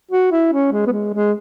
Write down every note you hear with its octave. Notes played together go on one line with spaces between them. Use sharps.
F#4
E4
C#4
G#3
B3
G#3
G#3